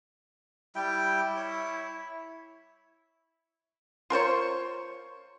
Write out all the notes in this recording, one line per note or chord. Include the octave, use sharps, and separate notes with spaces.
G3 E4 G5
C#5
F4 A#4 C5 C#5